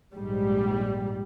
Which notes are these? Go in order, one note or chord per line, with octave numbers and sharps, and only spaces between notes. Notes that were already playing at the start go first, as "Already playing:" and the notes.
A#1 G#2 G3